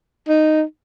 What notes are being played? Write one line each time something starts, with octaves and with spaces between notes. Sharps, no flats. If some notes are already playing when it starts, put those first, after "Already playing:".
D#4